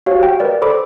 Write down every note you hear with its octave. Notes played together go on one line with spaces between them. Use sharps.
F#4 G4 C5 C#5 F5
G5
A#4 B4 D5
A4 C5 B5 D6